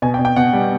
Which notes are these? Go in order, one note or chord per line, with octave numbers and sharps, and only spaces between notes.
B2 G#5
G5
B2
G5
B2 F#5
G3